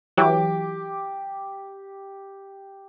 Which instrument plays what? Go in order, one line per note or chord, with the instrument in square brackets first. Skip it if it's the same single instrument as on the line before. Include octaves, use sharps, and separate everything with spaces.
[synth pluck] E3 F#3 [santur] G4 D6